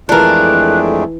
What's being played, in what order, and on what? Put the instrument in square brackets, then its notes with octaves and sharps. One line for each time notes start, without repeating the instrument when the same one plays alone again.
[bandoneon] F2 G#3 A3 [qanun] E3 F4 [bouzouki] D4 A#4 [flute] F#6